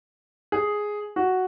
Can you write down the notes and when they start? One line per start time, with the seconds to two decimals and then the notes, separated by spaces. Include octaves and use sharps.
0.52 G#4
1.16 F#4